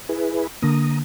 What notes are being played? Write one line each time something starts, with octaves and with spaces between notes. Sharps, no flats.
E4 G#4 B4
D3 A#3 A#5 D#6